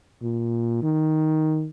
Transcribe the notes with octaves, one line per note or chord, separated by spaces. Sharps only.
A#2
D#3